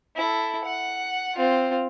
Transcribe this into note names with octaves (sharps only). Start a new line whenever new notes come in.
E4 A4
F#5
C4 F4